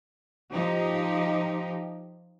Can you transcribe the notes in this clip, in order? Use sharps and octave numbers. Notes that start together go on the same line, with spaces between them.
F3 D#4 G4